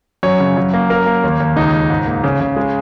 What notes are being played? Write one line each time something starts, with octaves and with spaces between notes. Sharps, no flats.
F#2 C#5
C#3
F#2
A#3
F#2 A#4
A#3
D#2
D#2
C#2 D#4
C#2
G#2
A#3
C#3
C#3
G#3